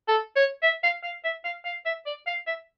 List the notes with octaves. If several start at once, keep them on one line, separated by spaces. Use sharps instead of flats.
A4
C#5
E5
F5
F5
E5
F5
F5
E5
D5
F5
E5